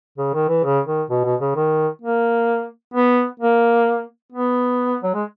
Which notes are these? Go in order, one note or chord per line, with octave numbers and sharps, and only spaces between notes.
C#3
D#3
E3
C#3
D#3
B2
B2
C#3
D#3
A#3
B3
A#3
B3
F#3
G#3